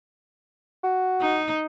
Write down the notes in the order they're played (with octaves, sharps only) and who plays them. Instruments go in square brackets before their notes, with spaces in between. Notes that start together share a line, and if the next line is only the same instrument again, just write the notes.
[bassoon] F#4
[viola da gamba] D#4